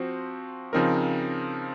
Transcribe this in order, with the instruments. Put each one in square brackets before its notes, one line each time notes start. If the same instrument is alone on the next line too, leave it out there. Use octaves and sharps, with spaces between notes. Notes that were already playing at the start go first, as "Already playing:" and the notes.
Already playing: [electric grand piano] F3 C4 F#4 C5
C#3 F3 C4 D#4 A#4